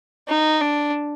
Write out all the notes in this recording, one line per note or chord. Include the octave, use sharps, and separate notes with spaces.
D#4
D4